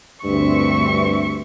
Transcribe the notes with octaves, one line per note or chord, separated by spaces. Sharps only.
D2 G2 C4 E5 C#6